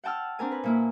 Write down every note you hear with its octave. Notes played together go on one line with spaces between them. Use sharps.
F#5 G5 A5 E6 F6
C4 D4 A#4 G#5
B4
A#2 A#3 E4